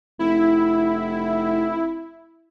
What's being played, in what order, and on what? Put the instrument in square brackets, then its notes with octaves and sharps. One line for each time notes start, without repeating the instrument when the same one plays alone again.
[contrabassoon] F1 [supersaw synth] E4